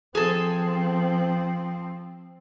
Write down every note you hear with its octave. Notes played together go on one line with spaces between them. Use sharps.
F3 C4 G#4 A4